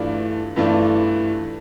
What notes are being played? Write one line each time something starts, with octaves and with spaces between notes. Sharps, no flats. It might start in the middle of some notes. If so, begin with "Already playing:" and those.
Already playing: G2 E3 A3 D4 F4
G2 E3 A3 D4 F4